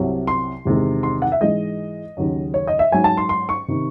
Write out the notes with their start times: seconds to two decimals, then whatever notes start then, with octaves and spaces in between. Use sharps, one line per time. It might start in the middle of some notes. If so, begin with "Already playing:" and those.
Already playing: C2 C3 F#3
0.27 C6
0.65 E2 C3 D#3 G#3
1.03 C6
1.22 F#5
1.32 E5
1.41 G#2 E3 G#3 D#5
2.17 D#2 C#3 F#3
2.54 C#5
2.67 D#5
2.79 E5
2.92 G#2 F#3 G#5
3.04 A5
3.17 C6
3.29 C6
3.49 C#6
3.68 C3 D#3